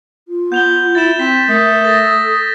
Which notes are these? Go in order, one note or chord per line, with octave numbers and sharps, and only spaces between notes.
F4
B3 G6 F7 G7
E4 A6 E7
C4 B6 E7
A3 A#4 D#6
A4 A6 A#6